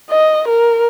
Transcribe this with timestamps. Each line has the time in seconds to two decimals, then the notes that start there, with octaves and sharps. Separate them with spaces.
0.10 D#5
0.48 A#4